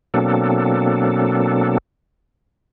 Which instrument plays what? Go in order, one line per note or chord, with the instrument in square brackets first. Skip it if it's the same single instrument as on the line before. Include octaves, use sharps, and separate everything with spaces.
[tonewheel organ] B2 F#3 A#3 C4 D4 A4